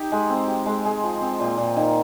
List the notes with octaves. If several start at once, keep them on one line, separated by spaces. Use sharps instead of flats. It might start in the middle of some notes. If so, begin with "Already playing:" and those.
Already playing: D#4 G4
G#3
C4
G4
G#3
G#3
F3
C4
A#2
A#2
D#3